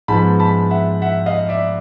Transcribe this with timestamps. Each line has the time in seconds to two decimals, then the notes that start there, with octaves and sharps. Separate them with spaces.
0.08 G#2 F3 G#3 B3 A5 B5
0.40 A5 B5
0.70 E5 F#5
1.02 E5 F#5
1.26 D#5 F5
1.49 D5 E5